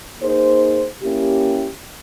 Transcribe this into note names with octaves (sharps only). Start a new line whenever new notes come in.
A#3 D#4 G#4 C5
A#3 C#4 E4 G4